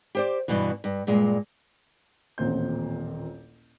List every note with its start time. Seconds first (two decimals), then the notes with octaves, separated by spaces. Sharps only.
0.15 G4 C5 D5
0.48 G2 B2 E3
0.84 G2
1.07 G2 A#2 G#3
2.38 D#1 A1 A#2 C4 G6